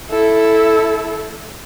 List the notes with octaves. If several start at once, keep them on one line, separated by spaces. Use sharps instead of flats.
E4 A4